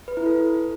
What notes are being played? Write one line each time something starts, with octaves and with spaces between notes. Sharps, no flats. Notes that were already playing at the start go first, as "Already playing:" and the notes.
B4
E4
A4